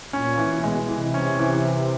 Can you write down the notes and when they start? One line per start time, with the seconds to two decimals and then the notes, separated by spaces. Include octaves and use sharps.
0.13 A#2 C#4
0.38 E3
0.51 B2
0.63 G#3
0.89 C3 E3
1.14 C#4
1.39 E3